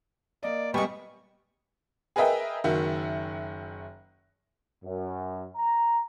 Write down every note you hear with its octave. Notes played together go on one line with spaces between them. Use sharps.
A#3 D5 D#5
G3 G#3 A#3 B3 G5 G#5 C#6
G#4 A#4 B4 D#5 E5 G5
F#1 D#3 F#4 E5
F#2
A#5